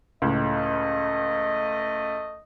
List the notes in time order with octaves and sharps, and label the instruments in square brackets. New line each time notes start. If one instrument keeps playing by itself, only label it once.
[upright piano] C#2 A2 [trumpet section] A3 D#5